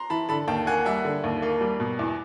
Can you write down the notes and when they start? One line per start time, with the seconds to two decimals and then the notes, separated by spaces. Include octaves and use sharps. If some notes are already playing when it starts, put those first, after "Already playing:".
Already playing: A#5 C6
0.10 E3 A5 B5
0.29 D3 A5 B5
0.48 D#2 G5 A5
0.67 A#3 F#5 G#5
0.86 G3 E5 F#5
1.05 D3
1.24 D#2
1.42 A#3
1.61 G3
1.80 B2
1.99 E2